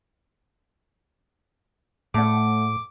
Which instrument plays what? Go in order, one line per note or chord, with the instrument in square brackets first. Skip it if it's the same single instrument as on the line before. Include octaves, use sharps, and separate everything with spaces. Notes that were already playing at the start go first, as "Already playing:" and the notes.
[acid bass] A2 [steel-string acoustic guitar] A3 F#5 [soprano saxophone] D6